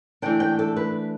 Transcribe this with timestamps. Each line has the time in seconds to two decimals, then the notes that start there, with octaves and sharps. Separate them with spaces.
0.22 E3 A3 D4 G5
0.40 G5
0.59 A4
0.76 B4